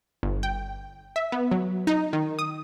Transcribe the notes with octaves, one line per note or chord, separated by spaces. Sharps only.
G1
G5
E5
B3
F#3
D#4
D#3
D#6